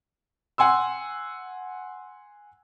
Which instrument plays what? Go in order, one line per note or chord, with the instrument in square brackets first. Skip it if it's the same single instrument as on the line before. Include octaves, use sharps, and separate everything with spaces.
[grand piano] F#5 G#5 C6 E6